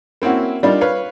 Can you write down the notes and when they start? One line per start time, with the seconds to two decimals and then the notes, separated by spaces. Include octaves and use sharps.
0.22 A#3 C4 C#4 E4 F#4
0.63 G3 A#3 D4 D#4 F4
0.81 B4 C#5 F5